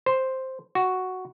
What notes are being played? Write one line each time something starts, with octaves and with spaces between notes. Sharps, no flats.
C5
F#4